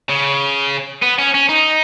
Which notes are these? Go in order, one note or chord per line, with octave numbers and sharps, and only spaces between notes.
C#3
B3
C#4
C#4
D#4